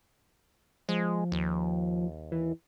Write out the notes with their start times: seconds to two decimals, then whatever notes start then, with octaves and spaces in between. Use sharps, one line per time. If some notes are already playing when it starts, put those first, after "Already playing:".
0.89 F3 G#3
1.32 D#2
2.32 E3